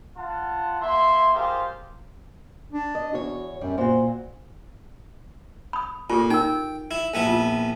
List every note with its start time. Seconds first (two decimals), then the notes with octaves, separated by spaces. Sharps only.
0.17 F4 F#5 A5
0.81 A#3 E4 E5 C6
1.34 F4 G4 G#4 A#4 C5 F5
2.72 D4
2.95 D#5
3.13 E2 F#4 C#5
3.61 F#2 G3
3.78 A#2 F#4 C5
5.73 B5 D#6
6.10 A#2 F4 G4 A4
6.30 D#4 A#4 G5
6.91 E4
7.14 A#1 B3 E4
7.27 F4